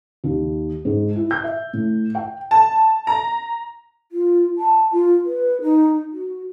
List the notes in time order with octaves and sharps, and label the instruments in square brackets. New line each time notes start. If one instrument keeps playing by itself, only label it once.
[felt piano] D#2
G#2
E4
G6
E5
A2
G5
[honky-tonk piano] A5
A#5
[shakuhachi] F4
A5
F4
B4
D#4
F#4